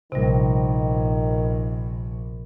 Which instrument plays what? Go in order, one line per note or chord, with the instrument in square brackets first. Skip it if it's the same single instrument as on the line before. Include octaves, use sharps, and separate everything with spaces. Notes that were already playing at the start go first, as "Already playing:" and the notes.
[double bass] A#1 [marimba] C3 G3 [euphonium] D#3